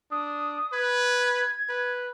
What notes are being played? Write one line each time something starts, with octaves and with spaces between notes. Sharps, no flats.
D4 D#6
B4 G#6
B4